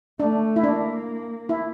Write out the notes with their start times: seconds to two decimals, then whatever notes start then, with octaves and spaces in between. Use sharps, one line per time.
0.20 A3 D4
0.56 E4
0.63 A#3 D4
1.49 E4